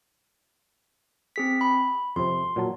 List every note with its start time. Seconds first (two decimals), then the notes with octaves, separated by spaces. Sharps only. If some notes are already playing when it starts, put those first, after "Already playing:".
1.36 C4 G#4 B6
1.61 B5
2.16 F2 C3 C6
2.56 A#2 F#3 A5